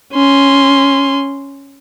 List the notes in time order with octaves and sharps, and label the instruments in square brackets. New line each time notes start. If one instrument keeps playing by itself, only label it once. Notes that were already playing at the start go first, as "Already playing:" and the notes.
[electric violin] C#4 C6